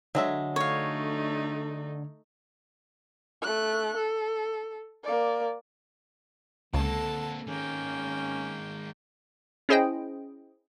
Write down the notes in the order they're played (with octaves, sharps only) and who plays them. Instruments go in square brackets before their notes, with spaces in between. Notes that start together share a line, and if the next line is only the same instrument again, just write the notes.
[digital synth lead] D3 [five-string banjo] F#3 G#3 E5
[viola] A3 D#4 [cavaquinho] C#5 F5
[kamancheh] A3 F#6
A4
A#3 D5
[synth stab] C#2 [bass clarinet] D3 [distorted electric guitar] A#3 C4 [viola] A4 A5
[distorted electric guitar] D#3 G#3 [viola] A#3 G5 [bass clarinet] C#4
[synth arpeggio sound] C#4 E4 G#4 C5 D#5 G5